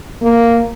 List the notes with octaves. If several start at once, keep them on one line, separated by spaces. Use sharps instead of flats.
A#3